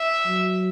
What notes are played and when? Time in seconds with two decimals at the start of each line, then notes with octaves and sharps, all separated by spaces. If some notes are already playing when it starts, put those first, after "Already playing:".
Already playing: E5
0.26 F#3